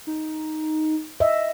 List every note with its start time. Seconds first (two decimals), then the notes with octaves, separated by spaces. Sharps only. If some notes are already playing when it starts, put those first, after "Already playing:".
0.07 D#4
1.20 D#5 E5